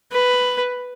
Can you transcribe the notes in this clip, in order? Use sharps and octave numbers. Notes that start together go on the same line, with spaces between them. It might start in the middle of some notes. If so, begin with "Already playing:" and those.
B4